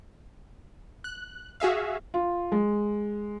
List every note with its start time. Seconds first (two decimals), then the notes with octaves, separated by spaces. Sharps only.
1.04 F#6
1.60 F#4 G#4 E5 F5
2.14 F4
2.52 G#3